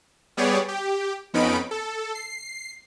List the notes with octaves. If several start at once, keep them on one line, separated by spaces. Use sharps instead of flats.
G3 B3 G4 G#4 C#5 D5
G4
F2 B3 C#4 D#4 B5 D7
A4
C7